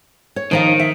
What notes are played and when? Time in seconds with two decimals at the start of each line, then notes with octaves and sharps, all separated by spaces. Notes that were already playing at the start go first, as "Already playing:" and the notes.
0.36 C#5
0.51 D#3 F3 D#4 F5
0.79 E5